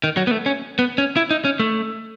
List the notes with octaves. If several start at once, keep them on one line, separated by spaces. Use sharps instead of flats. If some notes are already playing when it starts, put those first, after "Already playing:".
D#3
F#3
B3
A3
C#4
B3
C#4
E4
D#4
C#4
A3